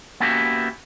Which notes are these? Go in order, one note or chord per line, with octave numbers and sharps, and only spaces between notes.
A#3 B3 C#4 E4 F#4 G4